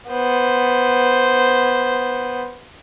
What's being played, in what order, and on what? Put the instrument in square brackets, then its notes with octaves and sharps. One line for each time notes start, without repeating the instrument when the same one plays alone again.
[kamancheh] B3 C5